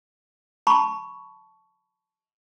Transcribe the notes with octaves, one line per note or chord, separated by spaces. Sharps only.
A5 B5 C#6